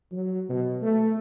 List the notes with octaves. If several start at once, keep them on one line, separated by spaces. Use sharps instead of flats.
F#3
B2
A3